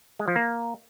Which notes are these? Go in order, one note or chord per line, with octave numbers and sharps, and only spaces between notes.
G#3
F3
A#3